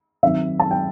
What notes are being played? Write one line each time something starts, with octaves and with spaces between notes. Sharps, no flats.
D#3 F#3 C4 E5
A5
G5